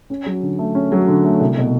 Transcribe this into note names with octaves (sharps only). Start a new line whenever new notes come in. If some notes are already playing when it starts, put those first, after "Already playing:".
C#4
F#3
D3
A3
C#4
F#3
D3
A3
C2
B2